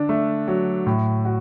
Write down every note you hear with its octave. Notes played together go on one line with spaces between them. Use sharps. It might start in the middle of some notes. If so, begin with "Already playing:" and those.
Already playing: D3 D4
A3
F#3
A2
F#4